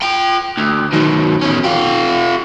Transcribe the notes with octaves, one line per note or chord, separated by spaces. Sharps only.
F4 G5
D2
D#3 F#3
E2 C#4
F4 G4